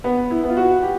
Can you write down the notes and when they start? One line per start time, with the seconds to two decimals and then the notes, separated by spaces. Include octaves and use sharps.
0.04 B3
0.30 E4
0.43 B3
0.50 F4
0.57 F#4
0.83 G4